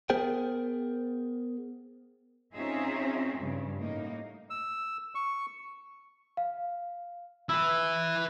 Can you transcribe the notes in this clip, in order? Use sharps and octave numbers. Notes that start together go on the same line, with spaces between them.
B3 G#4 A#4 C5 G5
C4 C#4 D#4 F4 G#4 E5
G2 C#3
A2 A#3 D#4
E6
C#6
F5
E4 B4 E6